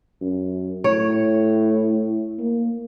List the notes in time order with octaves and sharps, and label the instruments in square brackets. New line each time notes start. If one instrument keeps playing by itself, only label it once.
[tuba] F#2
[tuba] A2 [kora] C#5
[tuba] A#3